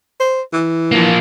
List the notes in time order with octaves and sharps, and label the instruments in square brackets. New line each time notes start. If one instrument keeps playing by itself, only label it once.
[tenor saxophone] C5
E3
[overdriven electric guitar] F3 A#3